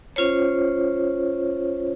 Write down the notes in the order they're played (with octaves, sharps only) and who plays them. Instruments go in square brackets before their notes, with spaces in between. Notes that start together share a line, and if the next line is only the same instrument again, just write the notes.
[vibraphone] C#4 F4 C5 C#5